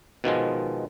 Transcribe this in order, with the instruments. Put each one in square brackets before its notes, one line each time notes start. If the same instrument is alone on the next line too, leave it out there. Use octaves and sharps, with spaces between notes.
[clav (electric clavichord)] B2 D#3 F3 G#3